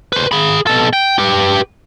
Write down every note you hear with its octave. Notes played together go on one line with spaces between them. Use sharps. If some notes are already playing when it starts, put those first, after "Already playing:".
B4 C5
G#4 B5
B2 A4
G5
G4 B4